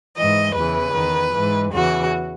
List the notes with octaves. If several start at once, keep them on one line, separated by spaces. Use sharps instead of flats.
G#2 E3 D#5
E2 C#3 E3 B4
E2 D#3
G#2 E3
E2 C#3 E3 F#4